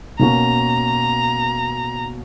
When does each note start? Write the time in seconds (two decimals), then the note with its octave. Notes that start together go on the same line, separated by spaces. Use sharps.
0.19 B2 A#3 C#4 F#4 A#5